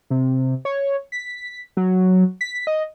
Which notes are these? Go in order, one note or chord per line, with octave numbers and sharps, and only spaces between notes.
C3
C#5
B6
F#3
B6
D#5